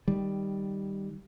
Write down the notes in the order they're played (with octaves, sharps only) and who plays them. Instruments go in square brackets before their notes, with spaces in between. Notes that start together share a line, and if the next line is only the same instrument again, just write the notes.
[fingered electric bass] D#3 G3